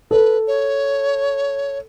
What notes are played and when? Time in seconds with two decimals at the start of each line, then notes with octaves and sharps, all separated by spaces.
0.11 A4 B4
0.48 C#5